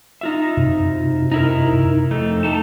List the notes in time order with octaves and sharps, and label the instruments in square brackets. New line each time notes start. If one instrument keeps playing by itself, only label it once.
[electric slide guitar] D#4 F4 E5
[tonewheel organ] F#2 C3
[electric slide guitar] D#4 E4 A#4
F2 A3 D#4
[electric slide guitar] A3 D#4 [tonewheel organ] A5